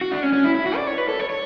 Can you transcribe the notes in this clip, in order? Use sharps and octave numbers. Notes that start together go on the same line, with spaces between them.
F#4
D4
C#4
C#4
E4
E4
F#4
D5
C#5
B4
A4
C#5
C#5